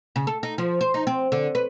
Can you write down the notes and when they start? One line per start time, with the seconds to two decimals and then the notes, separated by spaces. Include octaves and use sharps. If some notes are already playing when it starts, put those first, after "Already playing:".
0.16 C#3
0.27 A4
0.43 D#4
0.58 F3
0.81 C5
0.94 D#4
1.07 C4
1.32 D3
1.55 B4